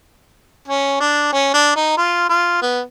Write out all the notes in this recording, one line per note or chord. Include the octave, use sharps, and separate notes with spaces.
C#4
D4
C#4
D4
D#4
F4
F4
B3